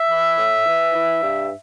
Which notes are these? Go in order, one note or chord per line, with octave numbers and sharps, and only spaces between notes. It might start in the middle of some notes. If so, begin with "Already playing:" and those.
Already playing: E5
E3
A2
E3
E3
G2